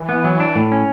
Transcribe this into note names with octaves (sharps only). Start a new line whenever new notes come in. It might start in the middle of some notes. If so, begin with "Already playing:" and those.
Already playing: E3
B3
F#3
D4
A2
C#4